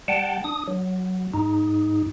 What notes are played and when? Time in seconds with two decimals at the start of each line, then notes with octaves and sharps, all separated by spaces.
0.08 G3 F#5 G5 A5
0.44 D4 D#6
0.68 F#3
1.34 G#2 D#4